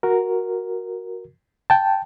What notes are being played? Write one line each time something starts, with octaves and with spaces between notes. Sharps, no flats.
F#4 A#4
G5 A5